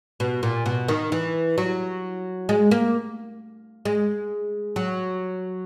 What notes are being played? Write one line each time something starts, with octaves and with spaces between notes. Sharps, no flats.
B2
A#2
B2
D#3
E3
F#3
G#3
A#3
G#3
F#3